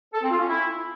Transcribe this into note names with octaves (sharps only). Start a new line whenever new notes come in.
A4
C4
F4
C#4
E4